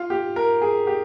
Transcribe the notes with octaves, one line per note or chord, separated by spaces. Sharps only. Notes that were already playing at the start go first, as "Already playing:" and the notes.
Already playing: F4
G4
A#4
G#4
G4